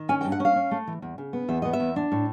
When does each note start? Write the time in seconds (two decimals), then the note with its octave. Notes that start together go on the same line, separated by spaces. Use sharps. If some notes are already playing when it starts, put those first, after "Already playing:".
Already playing: D#3
0.09 C#4 G#5
0.21 G5
0.25 G2
0.32 F#5
0.40 C#4 F5
0.56 C#4
0.71 A3
0.87 E3
1.02 E2
1.18 C#3
1.33 B3
1.48 E2 E5
1.62 B3 D#5
1.73 E5
1.80 E2
1.96 D4
2.12 A2